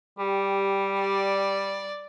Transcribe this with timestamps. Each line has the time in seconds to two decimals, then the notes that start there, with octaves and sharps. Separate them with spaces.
0.19 G3 G4
1.01 D5